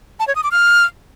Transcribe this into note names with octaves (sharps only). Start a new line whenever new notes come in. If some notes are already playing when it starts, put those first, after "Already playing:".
A5
C#5
D#6
D6
F6